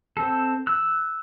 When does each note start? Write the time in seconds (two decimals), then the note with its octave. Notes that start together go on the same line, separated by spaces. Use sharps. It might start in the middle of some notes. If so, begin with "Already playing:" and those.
0.17 C4 A4
0.67 E6 F#6